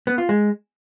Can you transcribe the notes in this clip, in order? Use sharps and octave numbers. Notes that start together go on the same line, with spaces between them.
B3
F4
G#3